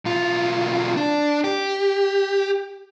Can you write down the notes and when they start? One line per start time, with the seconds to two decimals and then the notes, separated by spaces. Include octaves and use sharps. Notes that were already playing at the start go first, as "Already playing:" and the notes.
0.05 B1 F4
0.96 D4
1.44 G4